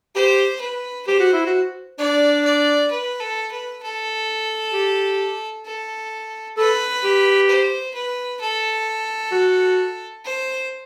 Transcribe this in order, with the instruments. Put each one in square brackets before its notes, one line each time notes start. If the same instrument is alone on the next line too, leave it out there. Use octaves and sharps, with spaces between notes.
[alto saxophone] G4 [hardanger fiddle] C5
[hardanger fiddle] B4
[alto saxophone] G4 [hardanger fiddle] C5
[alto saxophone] F#4
E4
F#4
[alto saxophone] D4 [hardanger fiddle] D5
[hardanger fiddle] D5
B4
A4
B4
A4
[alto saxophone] G4
[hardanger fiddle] A4
[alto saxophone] A4 [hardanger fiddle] B4
[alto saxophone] G4
[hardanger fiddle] C5
B4
A4
[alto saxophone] F#4
[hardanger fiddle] C5